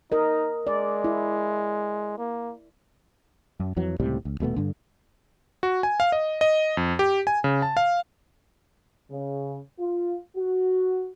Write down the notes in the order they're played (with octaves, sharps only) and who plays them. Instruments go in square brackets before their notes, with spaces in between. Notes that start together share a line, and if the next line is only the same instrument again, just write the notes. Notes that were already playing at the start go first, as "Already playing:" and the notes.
[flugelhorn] D#4 [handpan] A#4 D#5
[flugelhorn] G#3 [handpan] D5
[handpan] E4
[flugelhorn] A#3
[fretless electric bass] F#2
F2 E3 F#3
C#2 A2 C3 G3
C#2
D#1 B2 A3 B3
G2 D3
[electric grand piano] F#4
G#5
F5
D#5
D#5
F2
G4
G#5
C#3
A5
F5
[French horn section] C#3
F4
F#4